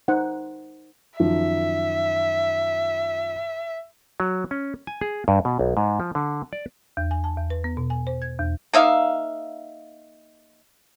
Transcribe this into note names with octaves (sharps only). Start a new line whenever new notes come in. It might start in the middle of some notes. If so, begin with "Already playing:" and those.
D#4 C5 F#5
F#2 D#3 F3 E5
F#3
C#4
G#5
G#4
G2
B2
B1
G#2
F3
D3
D5
E2
G#5
A5
E2
B4
B3
B2
G#5
C5
G#6
E2
A#3 D#4 E5 F5